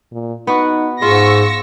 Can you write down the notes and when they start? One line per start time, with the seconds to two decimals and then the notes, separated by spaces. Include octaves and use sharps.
0.12 A#2
0.47 B3 D#4 F#4
1.02 G#2 F4 G#4 C#6 E6 A#6